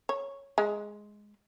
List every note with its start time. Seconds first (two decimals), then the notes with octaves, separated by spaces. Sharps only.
0.09 C#5
0.58 G#3